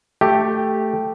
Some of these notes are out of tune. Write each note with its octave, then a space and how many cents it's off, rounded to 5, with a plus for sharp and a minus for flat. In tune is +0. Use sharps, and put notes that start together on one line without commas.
A3 +0 G4 +0